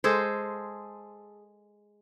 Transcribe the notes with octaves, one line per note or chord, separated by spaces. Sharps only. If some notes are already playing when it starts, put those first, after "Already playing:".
G#3 G#4 A4 C5